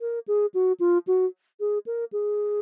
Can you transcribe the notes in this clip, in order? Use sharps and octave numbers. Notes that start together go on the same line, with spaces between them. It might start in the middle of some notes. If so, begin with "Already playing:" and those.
A#4
G#4
F#4
F4
F#4
G#4
A#4
G#4